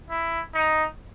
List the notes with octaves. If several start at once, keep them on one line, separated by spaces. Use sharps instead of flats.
E4
D#4